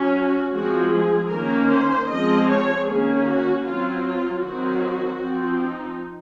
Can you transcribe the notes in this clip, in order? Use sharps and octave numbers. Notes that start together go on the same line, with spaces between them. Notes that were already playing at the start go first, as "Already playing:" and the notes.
Already playing: F#3 C#4
F#4
F3 G#3 C4 F#4
G#4
D#3 A#3 C#4 A#4
C5
F3 G#3 C4 D#5
C#5
D#3 A#3 C#4 G#4
F#4
F#3 C4 F4
F4
D#3 F#3 C4 F#4
F3 C4
D#4